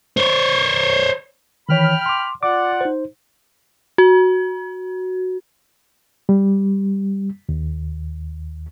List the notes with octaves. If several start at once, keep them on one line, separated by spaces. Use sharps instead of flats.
C5 C#5
D#3 E3 C#5 G5 B5 F6
C6 D6
F4 D5 F#5 D6
D#4 C5
F#4
G3
D#2